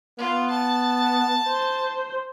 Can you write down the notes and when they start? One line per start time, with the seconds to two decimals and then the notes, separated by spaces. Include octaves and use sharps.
0.18 B3 F4
0.50 A5
1.47 C5